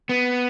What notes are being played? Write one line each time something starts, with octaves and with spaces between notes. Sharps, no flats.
B3